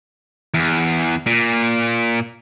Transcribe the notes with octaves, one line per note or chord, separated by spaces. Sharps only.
E2
A#2